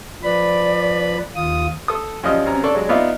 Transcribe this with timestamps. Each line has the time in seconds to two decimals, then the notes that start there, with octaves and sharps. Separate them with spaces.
0.23 F3 B4 D5 B5
1.36 D#2 F4 D#6
1.88 A4 D#6
2.23 F#2 F3 G3 D#5 F6
2.46 C2 F#2 A#5
2.64 D4 A4 D5 C#6
2.75 F#3 G#3 D4
2.89 B3 D#4 F4 D5 E5